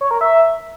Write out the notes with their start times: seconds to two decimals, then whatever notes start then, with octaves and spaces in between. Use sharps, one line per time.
0.01 C#5
0.11 A#4
0.21 E5